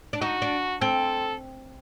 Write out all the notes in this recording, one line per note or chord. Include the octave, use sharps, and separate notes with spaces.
D4
D#4 F#4
D4
C4 A4